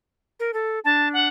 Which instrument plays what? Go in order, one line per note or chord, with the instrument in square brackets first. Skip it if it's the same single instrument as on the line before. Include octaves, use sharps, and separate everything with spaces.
[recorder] A#4
A4
[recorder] D4 [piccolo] A5
[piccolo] F#5